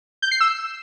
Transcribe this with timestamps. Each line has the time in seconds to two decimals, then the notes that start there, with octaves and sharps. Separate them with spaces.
0.22 G6
0.31 C7
0.41 E6